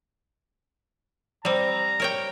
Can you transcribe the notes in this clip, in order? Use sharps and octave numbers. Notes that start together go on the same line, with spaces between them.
G3 C4 A#5
A#4 C#5 G5